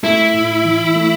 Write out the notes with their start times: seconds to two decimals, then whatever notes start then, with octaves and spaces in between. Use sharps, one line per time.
0.03 A3 E4
0.34 A2
0.65 E3
0.96 A3